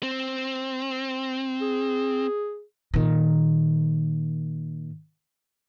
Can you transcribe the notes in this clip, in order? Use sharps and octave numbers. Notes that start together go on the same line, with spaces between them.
C4
G#4
A#2 D#3